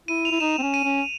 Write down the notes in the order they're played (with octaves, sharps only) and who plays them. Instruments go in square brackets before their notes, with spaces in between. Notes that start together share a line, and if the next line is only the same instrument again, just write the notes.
[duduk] E4 [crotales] D#7
[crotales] F7
[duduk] E4
[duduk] D#4 [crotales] E7
[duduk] C4
C#4
[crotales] D#7
[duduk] C#4